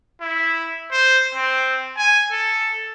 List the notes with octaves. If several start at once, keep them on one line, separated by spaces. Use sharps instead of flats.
E4
C5
C4
G#5
A4